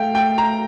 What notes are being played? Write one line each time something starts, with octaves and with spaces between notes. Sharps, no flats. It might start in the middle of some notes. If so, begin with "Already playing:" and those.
Already playing: A3 F5 G5
A3 G5
A#5